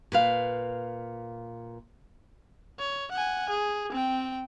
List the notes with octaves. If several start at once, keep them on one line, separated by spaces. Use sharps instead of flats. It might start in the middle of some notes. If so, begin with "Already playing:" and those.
A#2 B4 F5
C#5
F#5 G#5
G#4
C4 G5